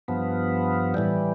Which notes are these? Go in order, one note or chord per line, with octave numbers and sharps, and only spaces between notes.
G2 F3 B3
A2 E3 G3